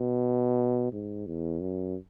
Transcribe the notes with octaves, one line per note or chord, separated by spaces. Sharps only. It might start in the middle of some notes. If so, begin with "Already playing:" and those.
Already playing: B2
G#2
E2
F#2